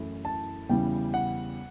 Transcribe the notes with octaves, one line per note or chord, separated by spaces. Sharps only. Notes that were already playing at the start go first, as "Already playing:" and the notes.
Already playing: F#2 E3 A3 E4
A5
E2 C#3 E3 G3 G5
F#5